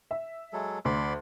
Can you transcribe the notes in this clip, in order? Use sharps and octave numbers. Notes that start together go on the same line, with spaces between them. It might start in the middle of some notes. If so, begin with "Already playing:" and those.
E5
F#3 G#3 A4
D2 D5 B5 C6